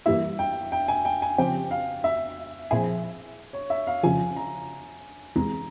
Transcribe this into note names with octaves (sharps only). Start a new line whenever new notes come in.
G2 E3 G3 A#3 E4 E5
G5
G5
G#5
G5
G#5
F2 C#3 F3 C4 G4 G5
F5
E5
A#2 F3 C4 E4 G#4
C#5
E5
F5
F2 C#3 F3 G#5
A#5
E2 C3 E3 G#3 A#5